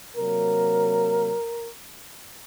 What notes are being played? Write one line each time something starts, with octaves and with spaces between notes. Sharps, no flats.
C3 F#3 A#3 A#4